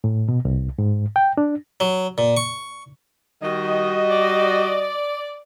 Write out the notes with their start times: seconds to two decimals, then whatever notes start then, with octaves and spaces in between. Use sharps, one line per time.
0.04 A2
0.29 B2
0.45 C2
0.79 G#2
1.16 G5
1.37 D4
1.80 F#3
2.18 A#2
2.37 C#6
3.42 D#3 G3 F#4 D#5
4.10 D5